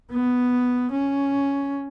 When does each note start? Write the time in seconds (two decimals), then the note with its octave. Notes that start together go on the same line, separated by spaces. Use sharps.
0.12 B3
0.91 C#4